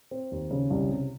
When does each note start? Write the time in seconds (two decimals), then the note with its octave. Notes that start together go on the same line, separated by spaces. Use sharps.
0.11 C4
0.32 D#2
0.51 C#3
0.70 C2
0.89 C3